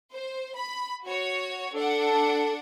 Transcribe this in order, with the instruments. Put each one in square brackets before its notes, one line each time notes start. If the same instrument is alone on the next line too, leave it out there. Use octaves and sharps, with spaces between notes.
[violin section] C5
B5
F#4 C#5
[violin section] D4 F#5 [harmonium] A4